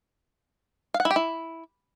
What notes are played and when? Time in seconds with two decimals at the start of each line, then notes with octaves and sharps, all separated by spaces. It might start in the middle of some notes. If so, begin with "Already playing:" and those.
0.94 F5
1.00 F#5
1.05 E4
1.11 G4
1.16 E4